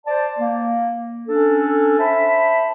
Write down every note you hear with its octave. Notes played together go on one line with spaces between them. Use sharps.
C5 D5 A5
A#3
C#4 D4 A4
C5 E5 A5 B5